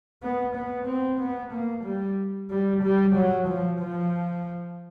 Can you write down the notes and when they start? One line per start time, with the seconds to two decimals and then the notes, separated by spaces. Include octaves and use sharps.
0.23 B3
0.56 B3
0.87 C4
1.19 B3
1.53 A#3
1.84 G3
2.50 G3
2.83 G3
3.16 F#3
3.48 F3
3.80 F3